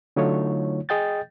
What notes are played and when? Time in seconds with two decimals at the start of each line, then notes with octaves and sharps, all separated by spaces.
0.16 D3 F#3 A3 D#4 F4 C#5
0.89 G#4 D#5 G5 G6 A6